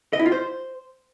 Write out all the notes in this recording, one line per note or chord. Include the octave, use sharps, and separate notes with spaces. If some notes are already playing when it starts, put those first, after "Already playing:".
D#5
E4
F4
C5